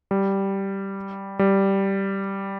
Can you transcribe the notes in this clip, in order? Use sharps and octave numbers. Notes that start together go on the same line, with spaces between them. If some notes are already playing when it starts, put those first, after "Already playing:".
G3
G3